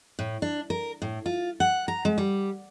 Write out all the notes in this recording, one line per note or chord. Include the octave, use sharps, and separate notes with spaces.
A2
D4
A#4
A2
F4
F#5
A#5
G#3
G3